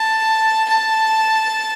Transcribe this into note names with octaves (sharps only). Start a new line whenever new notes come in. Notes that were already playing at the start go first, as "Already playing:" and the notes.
Already playing: A5
A5